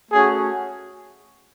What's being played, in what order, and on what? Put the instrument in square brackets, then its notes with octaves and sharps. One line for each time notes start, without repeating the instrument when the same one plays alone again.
[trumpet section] A3 C#4 F#4 G#4